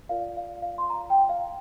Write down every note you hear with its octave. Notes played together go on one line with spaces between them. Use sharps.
F4 A#4 D5 F5
F5
F5
C6
A#5
G5
F5